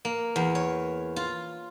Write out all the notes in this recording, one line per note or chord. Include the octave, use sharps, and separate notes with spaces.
A#3
E2
C#5
F4